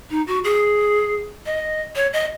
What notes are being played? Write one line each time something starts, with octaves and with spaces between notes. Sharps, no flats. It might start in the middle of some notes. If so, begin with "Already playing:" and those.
D#4
F#4
G#4
D#5
C#5
D#5